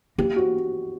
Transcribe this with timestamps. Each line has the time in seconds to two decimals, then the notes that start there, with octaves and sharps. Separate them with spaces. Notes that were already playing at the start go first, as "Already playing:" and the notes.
0.18 A#3 G4
0.36 F#4